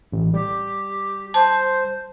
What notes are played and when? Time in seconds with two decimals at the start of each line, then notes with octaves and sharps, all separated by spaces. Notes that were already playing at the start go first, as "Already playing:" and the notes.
0.13 A1
0.34 G3 G4
1.34 C5 A5